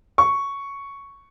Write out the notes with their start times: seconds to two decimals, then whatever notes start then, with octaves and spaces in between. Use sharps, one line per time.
0.18 C#6